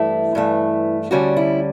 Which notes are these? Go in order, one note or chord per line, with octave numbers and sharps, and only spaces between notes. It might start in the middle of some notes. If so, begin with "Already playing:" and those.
Already playing: G2 E3 A3 E4
G2 E3 A3
D2 D3 G3 C#4 F#4
E4